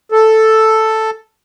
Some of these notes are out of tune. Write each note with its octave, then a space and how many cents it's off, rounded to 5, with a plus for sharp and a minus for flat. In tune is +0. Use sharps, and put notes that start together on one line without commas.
A4 +0